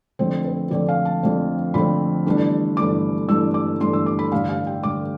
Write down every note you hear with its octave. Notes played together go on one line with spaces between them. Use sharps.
F2 D3 A3 C4 C5
B4
F2 D3 A3 C4 D5
F5
A5
F2 D3 A3 C4
F2 D3 A3 C4 B5
G1 G2 E3 A3 D4
G1 G2 E3 A3 D4 D6
G1 G2 E3 A3 D4 E6
D6
G1 G2 E3 A3 D4 C6
E6
D6
B5
A1 G2 D3 F5
F5
G5
A1 G2 D3 D6